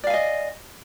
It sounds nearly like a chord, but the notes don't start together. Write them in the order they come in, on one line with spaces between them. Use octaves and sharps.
D5 F5 G#5 D#5